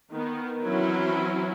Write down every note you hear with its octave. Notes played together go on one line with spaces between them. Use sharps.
D#3 B3
E3 F#3 C4 C#4 E4